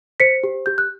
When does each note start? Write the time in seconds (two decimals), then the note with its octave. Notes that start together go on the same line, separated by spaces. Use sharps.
0.20 C5 B6 C#7
0.44 G4
0.66 G4 G6
0.78 F#6